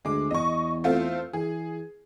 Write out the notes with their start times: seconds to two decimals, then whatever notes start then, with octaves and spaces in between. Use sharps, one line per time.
0.05 D2 G#3 D6
0.31 E2 D#5 C#6
0.84 A3 C4 F4
1.33 E3 G#4